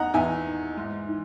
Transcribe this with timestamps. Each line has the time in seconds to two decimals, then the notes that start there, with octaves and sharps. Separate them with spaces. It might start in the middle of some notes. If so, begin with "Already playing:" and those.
Already playing: E2 D#3 D#5 F#5 A#5
0.14 E2 E5 G#5
0.46 D#3
0.77 G#2
1.09 E3